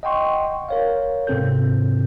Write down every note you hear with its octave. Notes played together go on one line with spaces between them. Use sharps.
D#5 F#5 G5 C6 C#6
A#4 C#5 F5
G#2 C3 C4 A4 G6